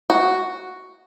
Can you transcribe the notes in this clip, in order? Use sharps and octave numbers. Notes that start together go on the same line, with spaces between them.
F#4